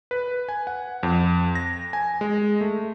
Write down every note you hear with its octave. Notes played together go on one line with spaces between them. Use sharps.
B4
G#5
F#5
F2
A#6
G#5
G#3
A3